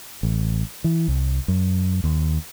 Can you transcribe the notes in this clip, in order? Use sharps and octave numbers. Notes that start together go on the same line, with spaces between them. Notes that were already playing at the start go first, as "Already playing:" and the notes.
A1
E3
C2
F#2
D#2